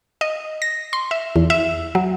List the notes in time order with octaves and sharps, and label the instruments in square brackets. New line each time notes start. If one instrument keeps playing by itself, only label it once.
[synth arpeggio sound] D#5
A#6
C6
E5
E2
E5
F#3